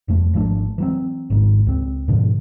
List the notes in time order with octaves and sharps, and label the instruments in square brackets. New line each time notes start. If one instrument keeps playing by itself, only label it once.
[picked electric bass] F#1 F2 A3
G#1 F3 A3 D4
E3 F#3 C4
G#1 C#2 G#2
C#2 C4
G#2 B2 D3 F3